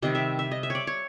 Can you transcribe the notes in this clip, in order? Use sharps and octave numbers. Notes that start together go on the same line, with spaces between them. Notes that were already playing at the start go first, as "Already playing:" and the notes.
C3 D#3 G3 D#5
E5
E5
D#5
E5
C#5 D5
C#5